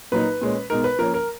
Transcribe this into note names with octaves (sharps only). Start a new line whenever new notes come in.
A#2 F#3 A#3 D#4 B4
A#2 G#3 C#4
B2 G#3 D#4 A#4
B4
F3 A#3 C#4 A#4
A#4